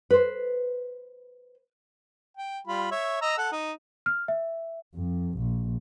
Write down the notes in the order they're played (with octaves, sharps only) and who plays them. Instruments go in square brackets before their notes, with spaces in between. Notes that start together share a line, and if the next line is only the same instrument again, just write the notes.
[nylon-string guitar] B4 C5
[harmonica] G5
G3 F4 B5
C#5 E5
D#5 A#5 E6
A4 F#5
D#4
[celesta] F6
E5
[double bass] F2
A#1